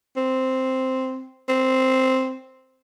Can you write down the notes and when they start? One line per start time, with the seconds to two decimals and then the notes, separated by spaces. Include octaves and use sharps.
0.17 C4
1.49 C4